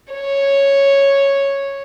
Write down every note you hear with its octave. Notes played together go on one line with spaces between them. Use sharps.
C#5